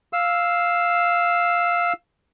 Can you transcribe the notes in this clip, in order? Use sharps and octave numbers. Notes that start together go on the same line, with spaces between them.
F5 E6